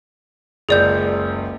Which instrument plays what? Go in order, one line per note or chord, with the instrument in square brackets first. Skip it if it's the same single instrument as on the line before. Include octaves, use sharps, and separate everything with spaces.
[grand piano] F#1 C#2 [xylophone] G#4 D5 G6